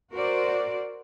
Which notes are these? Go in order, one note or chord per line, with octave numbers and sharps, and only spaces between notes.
F#4 A#4 C5 D5